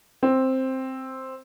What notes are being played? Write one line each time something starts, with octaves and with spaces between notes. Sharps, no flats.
C4